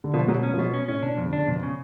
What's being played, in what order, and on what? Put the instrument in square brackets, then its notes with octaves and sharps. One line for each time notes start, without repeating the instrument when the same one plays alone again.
[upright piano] D3
[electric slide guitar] B2 [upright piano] F3
[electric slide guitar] B2 [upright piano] F#3
[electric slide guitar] C#4
[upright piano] F3
[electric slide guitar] B2 [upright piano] F#3
[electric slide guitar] C#4
[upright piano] A2 [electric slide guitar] C#4
[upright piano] B2 [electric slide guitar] D4
[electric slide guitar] F2
[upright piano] D3
[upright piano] C#3 [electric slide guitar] D4
[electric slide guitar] F2 [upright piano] B2
[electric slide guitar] C#3